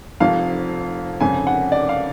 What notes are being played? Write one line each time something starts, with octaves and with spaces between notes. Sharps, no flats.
F1 F2 F3 F5
F1 F2 C#3 G#5
F#5
D5
F5